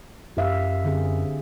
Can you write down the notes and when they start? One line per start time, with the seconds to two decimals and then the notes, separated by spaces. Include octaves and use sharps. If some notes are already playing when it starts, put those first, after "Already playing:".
0.37 F#2 G4 E5 F5
0.85 D3 C4 G#4